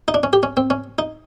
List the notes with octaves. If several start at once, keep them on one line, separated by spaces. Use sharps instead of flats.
D#4
D4
C#4
G4
C#4
C4
C#4
D#4